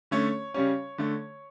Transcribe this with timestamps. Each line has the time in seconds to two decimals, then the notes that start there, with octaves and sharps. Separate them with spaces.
0.11 D3 A3 C#4 C#5
0.54 C#3 G3 C#4 C#5
0.98 D3 A3